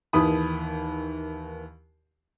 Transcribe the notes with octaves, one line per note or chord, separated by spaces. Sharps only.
D#2 D#3 E3 B5 D#6